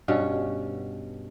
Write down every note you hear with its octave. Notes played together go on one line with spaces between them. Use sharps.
G2 B2 C#4 C#5